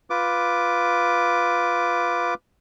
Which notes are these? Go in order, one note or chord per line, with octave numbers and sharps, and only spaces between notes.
F4 B4 D6